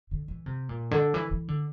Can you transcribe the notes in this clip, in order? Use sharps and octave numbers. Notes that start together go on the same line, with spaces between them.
D3
E3
C3
A#2
D3
E3
E3
D3